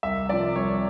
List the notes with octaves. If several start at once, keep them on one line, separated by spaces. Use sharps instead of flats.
C2 E5
C3 F3 D5
C2 C#5